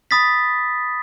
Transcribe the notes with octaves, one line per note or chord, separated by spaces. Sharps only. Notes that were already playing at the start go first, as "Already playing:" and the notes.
B5 D#6 A6 B6